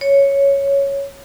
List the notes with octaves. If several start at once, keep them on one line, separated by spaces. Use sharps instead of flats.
C#5